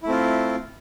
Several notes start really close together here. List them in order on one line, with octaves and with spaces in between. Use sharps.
E4 A3 C4 F4